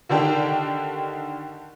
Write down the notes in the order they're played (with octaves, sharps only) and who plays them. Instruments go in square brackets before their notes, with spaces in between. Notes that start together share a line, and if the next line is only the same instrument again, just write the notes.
[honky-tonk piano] D3 D#3 D4 G4